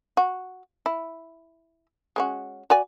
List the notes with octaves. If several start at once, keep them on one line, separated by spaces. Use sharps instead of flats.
F#4
E4
G#3 C#4 F#4
F#4 D5 G#5